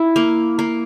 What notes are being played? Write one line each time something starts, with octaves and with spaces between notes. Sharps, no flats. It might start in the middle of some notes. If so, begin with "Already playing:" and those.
Already playing: E4
A#3
A#3